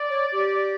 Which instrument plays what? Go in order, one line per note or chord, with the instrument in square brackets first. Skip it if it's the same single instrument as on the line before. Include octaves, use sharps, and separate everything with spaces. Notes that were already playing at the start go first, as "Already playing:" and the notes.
Already playing: [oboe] D5
[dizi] C#5
G4